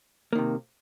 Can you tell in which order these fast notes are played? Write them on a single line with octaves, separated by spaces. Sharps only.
A#3 D#3 C3